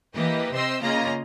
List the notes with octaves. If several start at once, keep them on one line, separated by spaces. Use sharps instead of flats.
E3 A#3 G4 B4 D#5
C3 C4 D#5 C6 E6
C#3 A#3 F4 D#5 A#5